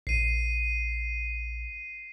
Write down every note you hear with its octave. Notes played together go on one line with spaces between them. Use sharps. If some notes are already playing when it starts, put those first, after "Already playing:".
A#1 C7 D#7